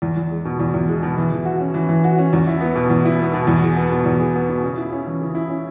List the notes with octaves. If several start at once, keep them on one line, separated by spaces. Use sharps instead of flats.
E2
E2
G#3
B2
E2
E2
G#3
B2
E3
E3
F#4
C#4
E3
E3
F#4
C#4
E2
E4
B3
B2
E2
E4
B3
B2
E2
G#4
B3
B2
E2
G#4
B3
B2
C#3
E4
C#4
E3
C#3
E4
C#4